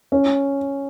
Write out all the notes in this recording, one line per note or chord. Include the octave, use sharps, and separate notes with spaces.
C#4